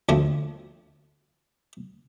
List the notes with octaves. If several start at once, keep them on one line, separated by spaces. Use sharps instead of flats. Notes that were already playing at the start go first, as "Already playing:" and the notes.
D2 F3 A3